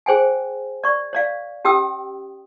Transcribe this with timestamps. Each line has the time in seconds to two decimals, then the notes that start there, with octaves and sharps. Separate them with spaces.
0.06 G#4 C5 G5 G#5
0.84 D5 C#6
1.13 C#5 D5 F5
1.65 C#4 G4 G5 D#6 E6